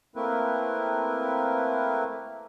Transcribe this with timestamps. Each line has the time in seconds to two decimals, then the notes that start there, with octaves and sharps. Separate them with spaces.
0.16 A3 A#3 C4 E4 A#4 B4